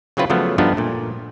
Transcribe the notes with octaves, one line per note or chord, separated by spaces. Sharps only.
C#3 F#3 C4 E4 F4 B4
C#3 F3 F#3 A3 B3
G2 F3 A3 B3 D4 D#4
A#2 A3